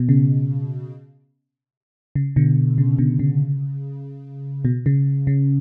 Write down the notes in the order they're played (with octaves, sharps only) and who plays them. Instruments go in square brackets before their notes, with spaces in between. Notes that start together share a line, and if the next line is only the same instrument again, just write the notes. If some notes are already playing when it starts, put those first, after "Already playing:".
Already playing: [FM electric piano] B2
C#3
C#3
B2 D3
C#3
B2 D3
C#3
B2
C#3
C#3